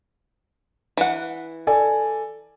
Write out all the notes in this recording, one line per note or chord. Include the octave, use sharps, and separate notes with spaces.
E3 F#5
A4 D5 G#5